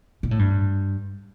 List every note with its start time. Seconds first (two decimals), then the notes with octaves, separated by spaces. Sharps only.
0.23 A#2
0.31 A2
0.39 G2